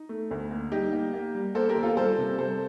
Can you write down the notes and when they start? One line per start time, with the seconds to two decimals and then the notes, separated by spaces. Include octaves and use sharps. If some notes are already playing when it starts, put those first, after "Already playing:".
Already playing: D#4
0.09 A3
0.31 D2
0.51 A#3
0.72 G3 D#4 G4
0.93 A#3
1.13 A#3
1.35 G3
1.55 A#3 A4 C5
1.69 G4 A#4
1.76 D#2
1.83 F4 A4
1.97 G3 A4 C5
2.18 C3
2.38 G3 A4 C5